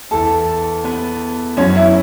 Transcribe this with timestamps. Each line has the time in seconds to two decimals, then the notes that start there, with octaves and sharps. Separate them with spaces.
0.11 E2 E3 A4 A5
0.84 B3 B4
1.57 F#2 F#3 C#4 C#5
1.75 E4 E5